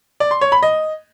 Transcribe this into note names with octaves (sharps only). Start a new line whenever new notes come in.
D5
C6
C#5
B5
D#5